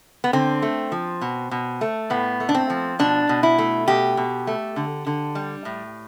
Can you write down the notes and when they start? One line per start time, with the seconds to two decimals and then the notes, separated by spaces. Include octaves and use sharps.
0.24 B3
0.33 D3 C4
0.62 A3
0.92 F3
1.22 B2
1.51 B2
1.81 A3
2.10 A2 B3
2.40 A3
2.49 D4
2.55 C4
2.70 F3
2.99 B2 D4
3.29 B2
3.43 E4
3.58 A3
3.88 B2 G4
4.17 B2
4.47 A3
4.76 D3
5.07 D3
5.35 G3
5.65 A2